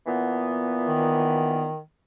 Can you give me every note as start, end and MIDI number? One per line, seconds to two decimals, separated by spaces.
0.07 1.69 46
0.07 1.69 52
0.07 1.69 59
0.88 1.79 51